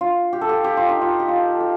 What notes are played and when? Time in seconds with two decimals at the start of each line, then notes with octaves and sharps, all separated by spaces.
0.01 F4
0.33 G4
0.41 A4
0.49 G4
0.64 G4
0.77 F4
0.89 D#4
1.01 F4
1.20 G4
1.28 F4
1.52 A4
1.60 G4